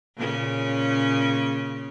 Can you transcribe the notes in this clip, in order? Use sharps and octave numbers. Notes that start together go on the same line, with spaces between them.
A#2 C#3 C#4